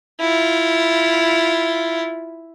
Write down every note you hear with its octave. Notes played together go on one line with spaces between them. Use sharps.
E4 F4